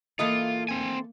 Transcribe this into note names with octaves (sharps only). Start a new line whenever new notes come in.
E3 A#3 F4 A4 D#5
C4 G#5